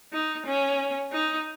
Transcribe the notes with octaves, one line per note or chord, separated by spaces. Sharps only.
D#4
C#4
D#4